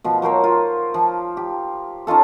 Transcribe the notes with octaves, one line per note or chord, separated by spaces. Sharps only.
B2 F3
F#3 A#4 C5 C#5
F4
F3
G4
C#4 D#4 F4 A4